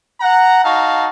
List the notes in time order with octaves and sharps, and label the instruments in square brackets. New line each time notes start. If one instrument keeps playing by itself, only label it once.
[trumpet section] F#5 A#5
D#4 F#4 F5 A5